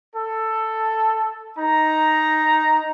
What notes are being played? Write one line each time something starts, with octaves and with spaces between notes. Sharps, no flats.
A4
D#4 A#5